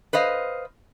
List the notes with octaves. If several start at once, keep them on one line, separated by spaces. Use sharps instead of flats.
B4 C5 D#5 F5